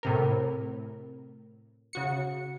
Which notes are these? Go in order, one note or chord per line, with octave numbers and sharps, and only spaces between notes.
A2 C3 A#4
C#3 F#4 C#7